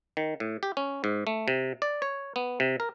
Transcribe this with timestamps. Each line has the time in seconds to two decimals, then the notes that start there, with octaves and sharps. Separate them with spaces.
0.17 D#3
0.40 A2
0.63 G4
0.77 C#4
1.04 G#2
1.27 A3
1.48 C3
1.82 D5
2.02 C#5
2.36 B3
2.60 C3
2.80 A#4